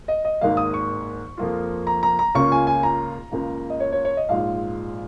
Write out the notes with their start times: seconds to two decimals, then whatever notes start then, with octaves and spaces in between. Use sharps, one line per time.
0.08 D#5
0.25 D#5
0.41 G#1 G#2 D#3 A#3 F5
0.57 D#6
0.74 C#6
1.37 F2 F3 A#3 F4
1.87 A#5
2.03 A#5
2.19 A#5
2.35 C#2 C#3 A#3 C#4 F4 C#6
2.52 G#5
2.67 G#5
2.83 A#5
3.31 C#2 C#3 A#3
3.70 D#5
3.80 C#5
3.92 C#5
4.05 C#5
4.17 D#5
4.29 A#1 G#2 G#3 F4 F5